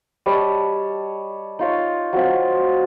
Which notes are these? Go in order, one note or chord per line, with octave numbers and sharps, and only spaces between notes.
G3 C#5 D#5 A5
D#4 F4 C#5
F#3 C4 F4